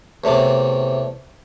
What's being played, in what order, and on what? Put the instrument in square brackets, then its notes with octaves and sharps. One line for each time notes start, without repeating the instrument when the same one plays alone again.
[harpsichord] E2 A2 C3 D6